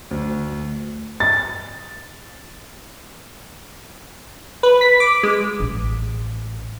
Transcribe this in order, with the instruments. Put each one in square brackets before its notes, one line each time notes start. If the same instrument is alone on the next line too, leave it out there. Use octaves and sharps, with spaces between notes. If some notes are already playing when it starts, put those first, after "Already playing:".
[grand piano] D2
[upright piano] A6
[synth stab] B4
B6
D6
G#3
[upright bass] A1